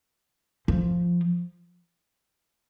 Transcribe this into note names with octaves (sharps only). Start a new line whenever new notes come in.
F3